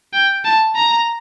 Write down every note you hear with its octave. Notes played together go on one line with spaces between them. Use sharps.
G5
A5
A#5